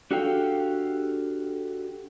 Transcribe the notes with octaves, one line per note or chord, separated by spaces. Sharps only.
D4 F#4 G4 A4 F5 G5